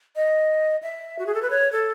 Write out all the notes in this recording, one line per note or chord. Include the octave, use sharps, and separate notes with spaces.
D#5
E5
F#4
G#4
A4
B4
C#5
A4